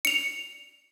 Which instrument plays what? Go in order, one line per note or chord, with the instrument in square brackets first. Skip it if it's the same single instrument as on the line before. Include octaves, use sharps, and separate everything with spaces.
[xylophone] C#7 F7